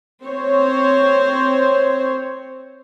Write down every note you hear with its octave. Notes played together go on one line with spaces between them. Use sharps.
C4 C5 C#5